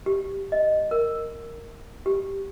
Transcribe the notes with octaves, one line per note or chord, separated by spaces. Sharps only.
G4
D#5
A#4
G4